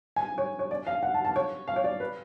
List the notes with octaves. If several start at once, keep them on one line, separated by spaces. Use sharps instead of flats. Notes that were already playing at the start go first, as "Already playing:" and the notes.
G#5
C#5
C#5
D5
F5
F#5
A5
A5
C#5
F5
C#5
D5
B4